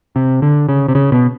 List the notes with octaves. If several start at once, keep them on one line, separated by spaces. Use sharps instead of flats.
C3
D3
C#3
C3
C#3
B2